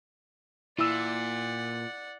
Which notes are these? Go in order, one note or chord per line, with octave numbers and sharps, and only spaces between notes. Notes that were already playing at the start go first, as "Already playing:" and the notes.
A#2 E4 D5 F#5 E6